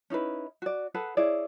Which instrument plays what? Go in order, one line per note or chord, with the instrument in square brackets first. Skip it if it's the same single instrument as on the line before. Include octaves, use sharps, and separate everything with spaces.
[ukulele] C#4 D#4 E4 B4
F#4 D5
G#4 A4 B4 F#5
E4 G#4 C#5 D5